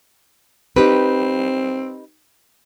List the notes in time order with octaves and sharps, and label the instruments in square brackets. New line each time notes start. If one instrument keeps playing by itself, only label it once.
[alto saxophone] C4 [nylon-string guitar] D#4 G4 B4